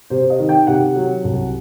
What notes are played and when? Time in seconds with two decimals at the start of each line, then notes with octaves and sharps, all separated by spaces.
0.10 C3 C5
0.30 D#5
0.39 D#3
0.49 G5
0.67 C3 F#5
0.96 F#3
1.24 C2